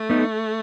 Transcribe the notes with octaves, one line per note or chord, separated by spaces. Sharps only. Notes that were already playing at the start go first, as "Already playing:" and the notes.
Already playing: A3
B3 D#4